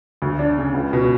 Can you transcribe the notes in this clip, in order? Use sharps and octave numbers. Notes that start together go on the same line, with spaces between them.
D2
D4
C#3
C#2
B2